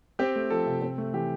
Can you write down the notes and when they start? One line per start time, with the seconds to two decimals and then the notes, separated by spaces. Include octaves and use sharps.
0.19 C4 G4
0.36 A3
0.50 F3 A4
0.66 C3
0.82 C4
0.98 A3
1.14 E3 G4